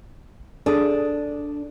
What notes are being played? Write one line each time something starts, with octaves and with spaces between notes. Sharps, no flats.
D4 G#4 A4 D#6